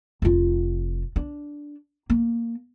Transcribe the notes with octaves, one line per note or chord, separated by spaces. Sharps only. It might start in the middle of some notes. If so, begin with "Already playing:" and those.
F1 F4
D4
A#3